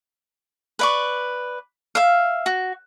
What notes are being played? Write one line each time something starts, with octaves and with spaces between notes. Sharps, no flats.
B4 D5 C#6
E5 F5
F#4